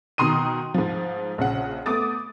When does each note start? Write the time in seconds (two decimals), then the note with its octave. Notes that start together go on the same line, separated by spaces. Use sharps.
0.18 B2 D#3 A#5 C6 D#6 D#7
0.74 G#2 F3
1.38 A#1 C#3 F#5
1.86 A3 B3 D6 D#6 A6